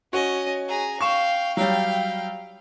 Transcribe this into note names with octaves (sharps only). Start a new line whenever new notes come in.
C#4 F#4 C#5 D#5
G#4 A#5
F5 G5 C#6 E7
F#3 G3 F5 G5